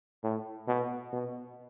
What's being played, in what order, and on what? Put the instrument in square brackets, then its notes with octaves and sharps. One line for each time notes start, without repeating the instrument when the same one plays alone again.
[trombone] A2
B2
B2